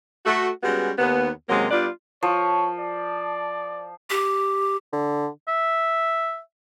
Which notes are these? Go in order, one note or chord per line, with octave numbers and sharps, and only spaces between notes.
A3 F#4
G3 G#3 B3 C#4 F#4
D#2 B3
F#2 C3 F#3 G#3 A#3
G3 B3 D4 F4 D5
F3 C#5
D5
G4
D3
E5